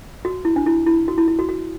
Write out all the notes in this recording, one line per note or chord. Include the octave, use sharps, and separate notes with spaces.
F#4
E4
D4
E4
E4
F#4
E4
E4
F#4
F#4